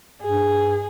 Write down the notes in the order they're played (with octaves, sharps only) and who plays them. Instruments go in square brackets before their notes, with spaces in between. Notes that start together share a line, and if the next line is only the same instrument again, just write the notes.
[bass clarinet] G2 [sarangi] G#4